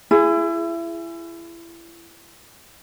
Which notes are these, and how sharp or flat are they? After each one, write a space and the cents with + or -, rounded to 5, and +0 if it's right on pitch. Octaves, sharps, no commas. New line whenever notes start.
E4 +30 G#4 +0